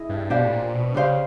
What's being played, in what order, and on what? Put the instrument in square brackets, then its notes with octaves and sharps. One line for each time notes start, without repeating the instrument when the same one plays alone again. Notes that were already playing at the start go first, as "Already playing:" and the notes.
Already playing: [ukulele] E4 G#4 D#5
[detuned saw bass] G2
[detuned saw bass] B2 [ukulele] D4 G4 C5 F5
[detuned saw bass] A2
A#2
B2
[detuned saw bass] C#3 [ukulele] D4 G4 C5 F5